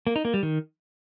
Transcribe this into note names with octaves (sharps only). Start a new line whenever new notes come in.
A#3
D#4
A#3
G3
D#3